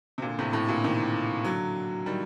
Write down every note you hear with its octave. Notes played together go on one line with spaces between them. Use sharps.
C3
A#2 D3
A2 C3
A2 C3
A#2 D3
C3 D#3
D3 F#3
D#3 G3